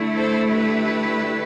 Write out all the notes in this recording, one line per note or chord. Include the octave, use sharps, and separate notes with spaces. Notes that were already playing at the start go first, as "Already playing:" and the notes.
Already playing: D3 A3 E4
A4 C5
G4 B4